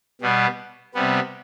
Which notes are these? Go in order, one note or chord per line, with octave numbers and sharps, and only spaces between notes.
B2 G3 B3
C3 G3 B3